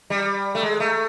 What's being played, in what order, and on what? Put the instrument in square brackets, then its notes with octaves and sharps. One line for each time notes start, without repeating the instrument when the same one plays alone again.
[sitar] G3
A3
G#3
A3